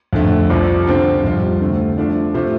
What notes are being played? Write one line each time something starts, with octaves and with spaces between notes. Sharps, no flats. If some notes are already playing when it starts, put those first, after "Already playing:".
F2 D3 A3
C2 C3 F3
D3 F3 C4 F4 C5
F2 C3 G3 F4
D2 D3 A3 C4
F3 A3 D4 F4 D5
C3 A3 F4 C5